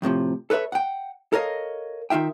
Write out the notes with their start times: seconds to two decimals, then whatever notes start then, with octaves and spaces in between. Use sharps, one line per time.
0.02 F2 A2 C3 F3
0.50 A4 B4 C#5 E5 B5
0.72 F#5 G5
1.33 A4 A#4 C#5 D#5 F5
2.10 D#3 D#4 F4 E5 G5